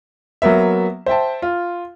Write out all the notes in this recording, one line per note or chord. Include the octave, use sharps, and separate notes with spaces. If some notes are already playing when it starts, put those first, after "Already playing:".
F#3 A#3 B3 E5
C5 E5 G5 A5
F4